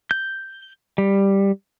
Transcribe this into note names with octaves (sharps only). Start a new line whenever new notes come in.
G6
G3